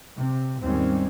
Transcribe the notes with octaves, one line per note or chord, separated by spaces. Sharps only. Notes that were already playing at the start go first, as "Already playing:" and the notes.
C3
D#2 G#2 G3 G#3 C4 C#4